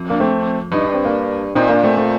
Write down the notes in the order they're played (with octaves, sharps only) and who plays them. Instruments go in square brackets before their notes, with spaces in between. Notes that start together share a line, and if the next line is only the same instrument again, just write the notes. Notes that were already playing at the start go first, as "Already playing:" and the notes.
Already playing: [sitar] F2
[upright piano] A#3 D4
A3 C4
[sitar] G2 [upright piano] D#4
[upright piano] D4
C4
A#3 D4
[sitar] A#2 [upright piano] C4 D#4
[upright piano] A#3 D4
A3 C4
A3 C4